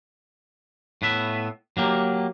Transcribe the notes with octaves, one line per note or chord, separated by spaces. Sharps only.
A2 B3 E5
F#3 A#3 G4